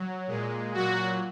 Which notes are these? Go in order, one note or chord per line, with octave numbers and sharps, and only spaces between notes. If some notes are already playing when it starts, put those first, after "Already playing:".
Already playing: F#3
A#2 G#3
A#2 F#3 F#4